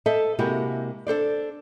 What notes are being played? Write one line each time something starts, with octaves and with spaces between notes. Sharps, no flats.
A4 C5 D#5 E5 A5
C3 G#3 A#3 E4 F#4 G4
D4 A4 C5 D5